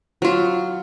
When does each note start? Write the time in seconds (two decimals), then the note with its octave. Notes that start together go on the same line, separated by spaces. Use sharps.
0.22 F#3 F4